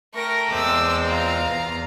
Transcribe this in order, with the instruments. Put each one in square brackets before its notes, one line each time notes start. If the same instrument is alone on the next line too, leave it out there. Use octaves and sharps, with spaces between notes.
[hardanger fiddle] A3 G5 [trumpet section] A#4 [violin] C#6 A#6
[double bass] E2 [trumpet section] G#3 C4 [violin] D6 E6
[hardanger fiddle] F4 [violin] F5 A#5
[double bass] E2